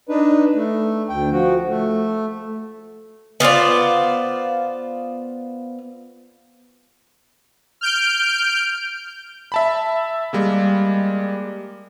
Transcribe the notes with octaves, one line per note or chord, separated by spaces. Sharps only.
D4 D#4 B4
A3
D2 G5
F3 F#4
A3
B3 F4 C5 D5
F6 G6 D7
E5 A5 B5
G3 G#3 A#3